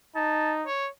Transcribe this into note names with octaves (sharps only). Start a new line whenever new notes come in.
D#4 A5
C#5